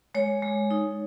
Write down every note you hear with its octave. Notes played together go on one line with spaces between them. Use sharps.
G#3 C#5
G#3
D#4